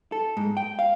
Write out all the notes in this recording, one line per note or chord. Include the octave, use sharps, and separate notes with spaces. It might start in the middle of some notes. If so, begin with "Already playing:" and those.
A4
G#2
G5
F5